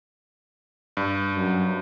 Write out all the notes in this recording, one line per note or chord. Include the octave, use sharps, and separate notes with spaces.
G2
F#2